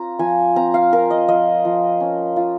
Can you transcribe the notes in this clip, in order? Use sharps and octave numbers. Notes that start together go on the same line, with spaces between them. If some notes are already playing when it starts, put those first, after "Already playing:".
Already playing: C4 F4 A#5
F3 G#5
C4 A#5
F5
F4 A#4
D#5
F3 D#5
F3
C#4
F4